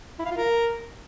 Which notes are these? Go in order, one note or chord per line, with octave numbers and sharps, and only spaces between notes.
E4
F5
F4
A#4